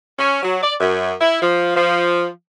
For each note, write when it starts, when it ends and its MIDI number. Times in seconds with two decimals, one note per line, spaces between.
0.19 0.42 61
0.43 0.58 54
0.63 0.74 74
0.80 1.13 42
1.21 1.42 64
1.42 1.75 53
1.76 2.27 53